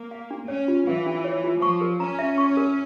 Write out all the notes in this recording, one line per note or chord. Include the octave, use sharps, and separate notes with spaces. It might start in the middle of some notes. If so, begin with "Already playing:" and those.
Already playing: A#3
F5
D4
C#4 C#5
F4
E3 F5
D4
C#5
F4
F3 C#6
A#4
C#4 A#5
E5
C#6
A#4